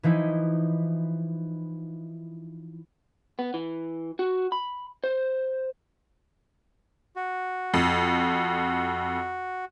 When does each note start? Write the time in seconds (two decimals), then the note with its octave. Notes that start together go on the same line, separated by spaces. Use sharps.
0.03 E3 F3 D#4 E4
3.39 B3
3.54 E3
4.19 F#4
4.52 B5
5.04 C5
7.16 F#4
7.74 F2